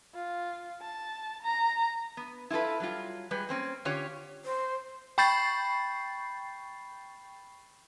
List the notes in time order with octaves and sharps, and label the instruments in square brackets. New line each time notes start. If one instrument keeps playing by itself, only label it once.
[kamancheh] F4
A5
A#5
[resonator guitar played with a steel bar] B3
E4 F4 G#4 A4 B4
F#3 G3 F4
G3 G#3 B4
A#3 C4 C#4
D3 C#4 F4 G4 C#5
[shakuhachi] C5
[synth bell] G5 B5 C#6 G6 A6 C7